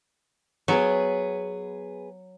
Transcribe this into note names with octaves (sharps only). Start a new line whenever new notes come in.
F#3 B3 G#4 B4